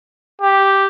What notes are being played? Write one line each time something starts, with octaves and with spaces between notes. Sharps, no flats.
G4